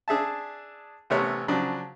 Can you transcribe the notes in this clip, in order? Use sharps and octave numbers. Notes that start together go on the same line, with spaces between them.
D4 G#4 E5 A5
A1 C3 A3 B3 A#4 C#5
C#3 F3 F#3 D4